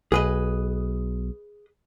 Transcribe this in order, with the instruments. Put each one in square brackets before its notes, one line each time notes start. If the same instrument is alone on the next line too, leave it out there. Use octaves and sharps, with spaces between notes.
[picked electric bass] B1 [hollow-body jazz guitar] G#4 B4 D#5